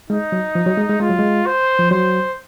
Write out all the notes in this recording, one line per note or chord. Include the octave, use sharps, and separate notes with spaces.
G#3 D#4
F#3
F3
F#3
G#3
G#3
G#3 F4
F#3
G#3
C5
F3
F#3 C5